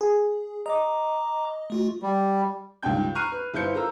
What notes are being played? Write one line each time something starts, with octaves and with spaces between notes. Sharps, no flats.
G#4
D#5 A#5 D6
A3 F4 F#4
G3
C#2 G2 D#3 D4 G5 G6
A#5 C#6 F6 F#6 C7 D#7
B4
G1 E4 B4 C5 G6 C#7
F4 A4 A#4 A#5 E6